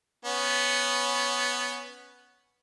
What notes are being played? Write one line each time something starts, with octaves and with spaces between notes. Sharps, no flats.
B3 C#4